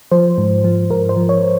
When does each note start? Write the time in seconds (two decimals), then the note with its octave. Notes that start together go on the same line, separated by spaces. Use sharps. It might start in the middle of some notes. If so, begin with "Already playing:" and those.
0.11 F3 C5
0.38 G#2
0.64 F3
0.90 G#2 A#4
1.09 C5
1.17 F3
1.29 C#5